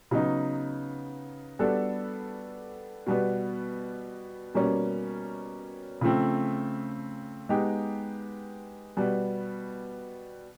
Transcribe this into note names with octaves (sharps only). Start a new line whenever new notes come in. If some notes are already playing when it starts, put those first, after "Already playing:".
C#3 F#3 B3 D#4
G3 B3 D4 F#4 A4
B2 G3 B3
B2 G3 A#3 C#4
C#3 F3 A3 C4
G#3 B3 D#4 G4
B2 G3 B3